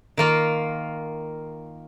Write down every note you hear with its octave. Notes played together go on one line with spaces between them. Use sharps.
D#3 A#3 F4